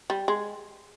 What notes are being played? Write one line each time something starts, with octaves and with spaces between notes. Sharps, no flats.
G3
G#3